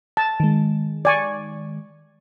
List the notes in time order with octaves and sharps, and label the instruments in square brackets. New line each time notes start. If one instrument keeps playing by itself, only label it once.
[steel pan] A5
[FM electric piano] D#3 G#3
[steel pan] D5 G#5 C#6